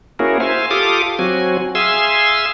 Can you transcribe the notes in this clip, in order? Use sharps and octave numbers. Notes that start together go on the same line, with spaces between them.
A#3 C#4 E4 F#4 G#4 A#4
C5 E5 F5 G#5
F4 G4 A4 F5 D6 D#6
F#3 C4 F#4 G#5
G#4 E5 F5 G#5 C6 E6